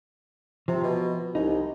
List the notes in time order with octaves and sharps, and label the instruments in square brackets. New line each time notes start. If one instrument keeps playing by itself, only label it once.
[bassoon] C3 [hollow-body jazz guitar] F3
[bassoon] B2
[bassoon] C2 [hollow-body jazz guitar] D#4